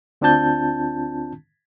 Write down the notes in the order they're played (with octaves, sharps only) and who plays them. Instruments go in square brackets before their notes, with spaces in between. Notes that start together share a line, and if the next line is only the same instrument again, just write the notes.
[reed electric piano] D2 C4 D4 F4 A5 G6